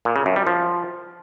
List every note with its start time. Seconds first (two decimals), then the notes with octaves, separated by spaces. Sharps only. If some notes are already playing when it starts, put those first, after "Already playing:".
0.05 A#2
0.16 C#3
0.26 F#2
0.36 G3
0.47 F3